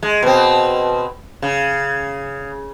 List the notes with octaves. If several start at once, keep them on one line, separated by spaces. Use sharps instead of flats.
G#3
B2 C4
C#3